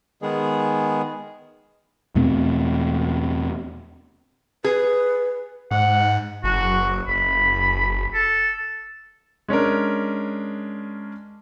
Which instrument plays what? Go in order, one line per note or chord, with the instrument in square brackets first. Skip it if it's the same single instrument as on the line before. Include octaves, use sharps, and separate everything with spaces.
[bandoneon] D#3 G#3 B3 G#4
[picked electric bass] E2 B2 A3 C4
[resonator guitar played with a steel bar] G#4 [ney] B4
[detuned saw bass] G#2 [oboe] F#5
[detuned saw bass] F#1 [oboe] F#4
[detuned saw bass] F#1 [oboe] B5
[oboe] A4
[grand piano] G#3 C#4 D4 A#4